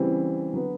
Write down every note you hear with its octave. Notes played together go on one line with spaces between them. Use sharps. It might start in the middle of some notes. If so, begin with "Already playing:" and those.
Already playing: C#3 E3 G3 C4
D3 F#3 B3